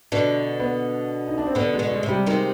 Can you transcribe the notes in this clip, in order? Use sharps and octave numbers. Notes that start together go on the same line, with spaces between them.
B2 D3 D4
B3
D#4
D4
C4
B2 D3 B3
G#3
B2 D3
G#3
C3
G3
C3 D#3 G#3